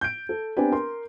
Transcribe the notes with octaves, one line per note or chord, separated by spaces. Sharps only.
G6 D7
A4
B3 C4 D4 G4 B4 G#5
A#4 C6